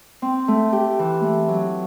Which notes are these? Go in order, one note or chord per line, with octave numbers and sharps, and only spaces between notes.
C4
A3
G4
E3
A3
F#3